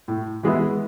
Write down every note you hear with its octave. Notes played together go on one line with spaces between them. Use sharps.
A2
E3 G#3 B3 E4